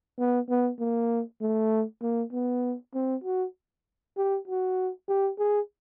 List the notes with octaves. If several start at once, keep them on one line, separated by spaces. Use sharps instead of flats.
B3
B3
A#3
A3
A#3
B3
C4
F#4
G4
F#4
G4
G#4